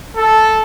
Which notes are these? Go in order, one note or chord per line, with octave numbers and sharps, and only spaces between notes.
A4